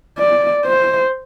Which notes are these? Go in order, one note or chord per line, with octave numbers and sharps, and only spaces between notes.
D5
C5